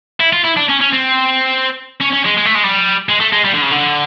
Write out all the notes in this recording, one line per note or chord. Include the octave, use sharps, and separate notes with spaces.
E4
F4
E4
D4
C#4
C#4
C4
C#4
C#4
G#3
G#3
A3
G#3
G3
G#3
A3
G#3
G3
D3
C#3
D3